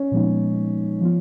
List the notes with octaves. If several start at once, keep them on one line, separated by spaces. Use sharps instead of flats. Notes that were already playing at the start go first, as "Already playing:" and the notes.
Already playing: C#4
A#2 F3 G#3 B3 D#4
F3 B3 F4